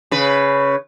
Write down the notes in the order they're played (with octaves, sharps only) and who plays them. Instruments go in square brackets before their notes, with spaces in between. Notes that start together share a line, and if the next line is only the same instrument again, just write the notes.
[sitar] C#3 B4